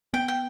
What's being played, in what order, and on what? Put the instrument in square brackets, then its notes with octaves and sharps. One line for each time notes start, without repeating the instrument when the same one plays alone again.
[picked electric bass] B3 [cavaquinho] G5
[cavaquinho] G5